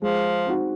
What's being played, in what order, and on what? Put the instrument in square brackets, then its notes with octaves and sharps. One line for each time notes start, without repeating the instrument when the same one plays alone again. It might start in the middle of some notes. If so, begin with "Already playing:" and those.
[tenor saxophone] F3 [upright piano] G#3
[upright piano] C4 D#4 F#4